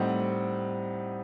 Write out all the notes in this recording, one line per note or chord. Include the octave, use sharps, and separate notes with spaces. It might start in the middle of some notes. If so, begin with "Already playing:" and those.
Already playing: A2 G3 C4 D#4 F#5